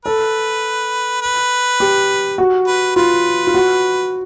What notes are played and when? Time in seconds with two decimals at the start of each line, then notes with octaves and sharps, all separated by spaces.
0.05 A4 B4
1.22 B4
1.80 G4
2.38 F#4
2.67 B4
2.96 F4 B4
3.47 F4
3.54 F#4